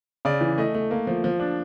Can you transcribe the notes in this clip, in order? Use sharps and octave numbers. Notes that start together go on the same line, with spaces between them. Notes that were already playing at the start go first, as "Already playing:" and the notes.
C#3 D5
E3
A3 D#5
A3
A#3
F3
F3
D4